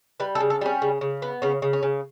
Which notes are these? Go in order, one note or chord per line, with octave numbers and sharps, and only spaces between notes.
G3 B4
A4
C#3
A4
G3 C#4
C#3
C#3
B3
C#3 C#4
C#3
C#4
C#3